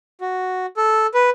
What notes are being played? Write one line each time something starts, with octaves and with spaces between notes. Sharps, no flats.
F#4
A4
B4